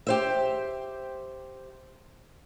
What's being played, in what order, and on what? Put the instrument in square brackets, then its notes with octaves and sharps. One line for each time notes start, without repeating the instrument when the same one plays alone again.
[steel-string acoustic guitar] G4 C5 E5